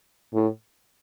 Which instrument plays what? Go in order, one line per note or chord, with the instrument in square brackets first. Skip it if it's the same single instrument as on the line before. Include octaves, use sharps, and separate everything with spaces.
[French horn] A2